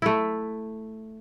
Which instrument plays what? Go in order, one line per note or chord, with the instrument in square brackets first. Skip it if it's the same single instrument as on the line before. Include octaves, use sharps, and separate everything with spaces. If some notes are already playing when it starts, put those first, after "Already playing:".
[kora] A3 E4